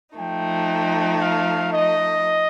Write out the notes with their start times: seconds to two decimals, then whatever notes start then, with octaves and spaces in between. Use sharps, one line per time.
0.16 F3 A3 D#4 G5
1.19 F5
1.72 D#5